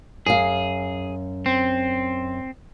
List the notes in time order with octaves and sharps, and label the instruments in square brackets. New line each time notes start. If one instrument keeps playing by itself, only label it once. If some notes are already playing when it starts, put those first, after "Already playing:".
[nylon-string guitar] F#2 F5 [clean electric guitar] G#4
[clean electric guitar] C4